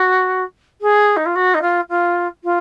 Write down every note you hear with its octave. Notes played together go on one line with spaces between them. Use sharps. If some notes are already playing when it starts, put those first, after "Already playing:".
Already playing: F#4
G#4
D#4
F4
F#4
D#4
F4
F4
F4